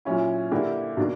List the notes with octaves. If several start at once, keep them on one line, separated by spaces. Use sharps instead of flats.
A#2 F#3 C#4 E4
D3 A#3 E4 G4
B2 A#3 D4